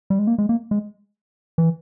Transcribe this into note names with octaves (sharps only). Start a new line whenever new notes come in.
G3
G#3
A#3
G#3
A#3
G#3
E3